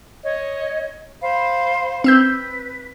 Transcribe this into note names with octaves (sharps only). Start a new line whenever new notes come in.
C#5 D#5
C5 F5 B5
C4 B4 E6 G6